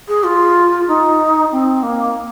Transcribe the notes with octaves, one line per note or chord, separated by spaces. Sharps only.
G#4
F4
D#4
C4
A#3